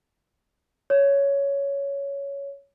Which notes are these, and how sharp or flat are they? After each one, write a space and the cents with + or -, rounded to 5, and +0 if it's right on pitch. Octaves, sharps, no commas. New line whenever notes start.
C#5 +10